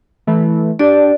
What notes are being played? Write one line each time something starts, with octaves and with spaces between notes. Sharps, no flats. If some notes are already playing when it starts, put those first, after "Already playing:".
E3 A3
D4 G4 D5